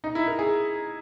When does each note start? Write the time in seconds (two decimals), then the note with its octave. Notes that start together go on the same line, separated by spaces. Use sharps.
0.04 D#4
0.15 E4
0.27 A#4
0.39 G#4